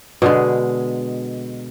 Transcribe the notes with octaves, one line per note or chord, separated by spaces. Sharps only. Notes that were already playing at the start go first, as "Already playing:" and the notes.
B2 D3 G#3